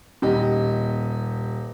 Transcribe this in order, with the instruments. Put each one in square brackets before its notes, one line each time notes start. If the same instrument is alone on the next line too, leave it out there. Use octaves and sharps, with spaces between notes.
[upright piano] D#1 G4 D#5